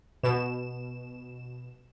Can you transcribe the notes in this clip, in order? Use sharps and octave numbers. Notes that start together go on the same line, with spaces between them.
B2 E7